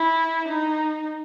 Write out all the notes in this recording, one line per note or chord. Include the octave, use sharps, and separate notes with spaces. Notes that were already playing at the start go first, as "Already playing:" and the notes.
Already playing: E4
D#4